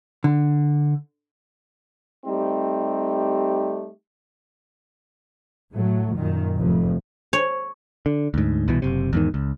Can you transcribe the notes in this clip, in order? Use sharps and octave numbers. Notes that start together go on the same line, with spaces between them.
D3
G3 A3 C4 D#4 G4
A2 F#3 A3
F#2 A#2 D#3
F1 F2 A2
C#5
D3
D2 G#2
C2 B2 E3
F#1 C3
E2 G#2 D#3
C#2